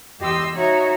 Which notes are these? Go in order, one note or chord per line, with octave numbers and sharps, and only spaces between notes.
E2 G4 D#5 C6 E6
D#4 F#4 C#5 E5